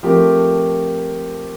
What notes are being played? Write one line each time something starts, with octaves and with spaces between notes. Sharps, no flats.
F3 A3 C4 G4 A#4